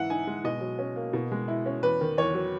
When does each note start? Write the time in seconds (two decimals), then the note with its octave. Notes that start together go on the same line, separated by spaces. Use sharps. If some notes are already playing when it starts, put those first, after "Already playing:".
Already playing: G#2 E3 E5 F#5
0.10 D#4 G#5
0.27 G#3
0.44 B2 D#5
0.61 F#3
0.79 C#4
0.96 A#3
1.13 B2
1.32 G#3
1.48 E4
1.66 C#4
1.83 E2 B4
2.01 D#3
2.18 E2 C#5
2.34 F#3